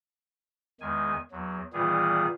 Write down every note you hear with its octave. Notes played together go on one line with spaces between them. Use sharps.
E2 D#3 G#3 G#5
E2 F#3
A#2 D#3 E3 G3 B3 G#4